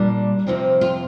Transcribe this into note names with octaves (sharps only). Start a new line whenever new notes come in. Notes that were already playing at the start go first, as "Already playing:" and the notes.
Already playing: A#2 G3 D4
F2 C3 F3 C4
F4